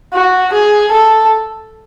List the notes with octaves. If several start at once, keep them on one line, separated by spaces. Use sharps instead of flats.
F#4
G#4
A4